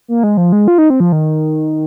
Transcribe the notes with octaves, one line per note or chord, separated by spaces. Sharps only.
A#3
G#3
F3
G#3
F4
D#4
C4
F3
D#3